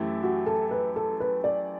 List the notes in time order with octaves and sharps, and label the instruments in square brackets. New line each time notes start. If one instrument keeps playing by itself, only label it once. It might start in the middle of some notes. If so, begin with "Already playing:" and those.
Already playing: [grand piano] F#2 E3 A3 E4 G4
[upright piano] F#4
A4
B4
A4
B4
D5